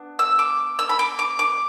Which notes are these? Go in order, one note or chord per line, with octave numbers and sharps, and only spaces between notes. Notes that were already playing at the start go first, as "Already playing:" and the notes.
Already playing: B3 D4
E6
D6
E6
B5
D6
D6
D6